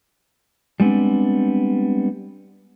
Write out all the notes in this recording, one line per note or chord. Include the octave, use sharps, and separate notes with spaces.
G3 G#3 B3 C4 D4